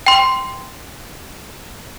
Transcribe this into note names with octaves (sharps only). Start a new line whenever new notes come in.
G5 C6